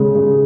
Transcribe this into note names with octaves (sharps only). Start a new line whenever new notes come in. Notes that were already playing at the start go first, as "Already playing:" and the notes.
Already playing: C#3 G#3
C#3